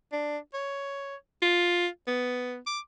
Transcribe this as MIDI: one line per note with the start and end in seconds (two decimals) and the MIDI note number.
0.12 0.38 62
0.54 1.16 73
1.42 1.87 65
2.07 2.57 59
2.67 2.80 86